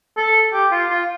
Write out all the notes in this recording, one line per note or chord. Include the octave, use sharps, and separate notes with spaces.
A4
G4
F4
F4